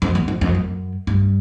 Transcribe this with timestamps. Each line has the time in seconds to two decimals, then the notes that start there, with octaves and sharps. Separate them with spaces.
0.02 F2
0.15 E2
0.28 F2
0.41 F2
0.55 F#2
1.07 G2